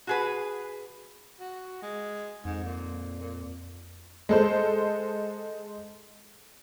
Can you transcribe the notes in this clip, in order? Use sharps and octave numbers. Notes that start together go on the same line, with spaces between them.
F#4 G#4 B4
F#4
G#3
F2 G#2
A#2
A#2
G#3 A4 C5